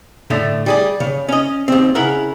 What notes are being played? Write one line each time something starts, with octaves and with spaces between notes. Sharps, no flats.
A2 D3 A3
G3 G#4 D5
C#3
C#4 D#5
D#2 C4
C#3 E4 A#4 F#5